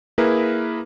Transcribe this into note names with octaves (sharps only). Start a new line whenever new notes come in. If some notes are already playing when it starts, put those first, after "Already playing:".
A#3 E4 G#4 A#4 B4